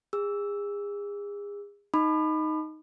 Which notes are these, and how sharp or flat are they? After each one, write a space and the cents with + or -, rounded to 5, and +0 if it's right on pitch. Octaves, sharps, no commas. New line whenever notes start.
G#4 -35 E6 +0
D#4 +0 B5 +15 D6 +45